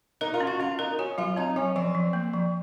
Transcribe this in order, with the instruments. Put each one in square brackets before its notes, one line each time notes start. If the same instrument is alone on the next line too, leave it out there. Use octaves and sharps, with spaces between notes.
[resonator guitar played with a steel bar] D#4 [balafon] A#4
[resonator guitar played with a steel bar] F4
[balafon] C#4
[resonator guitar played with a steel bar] F#4
[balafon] C#4 [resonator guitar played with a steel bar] F4
[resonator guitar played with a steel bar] D#4 [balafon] A#4
[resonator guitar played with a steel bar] C#4 [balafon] F#4
[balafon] F#3 [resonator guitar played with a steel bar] F4
[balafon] C4 [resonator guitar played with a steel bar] D#4
[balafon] F#3 [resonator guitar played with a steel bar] C#4
[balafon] F3 [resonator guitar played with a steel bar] C4
[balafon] F3
A#3
F3